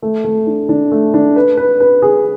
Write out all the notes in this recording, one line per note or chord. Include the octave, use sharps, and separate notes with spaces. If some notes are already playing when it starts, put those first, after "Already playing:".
A3
A3
D4
D4
A3
D4
B4
B4
B4
G#4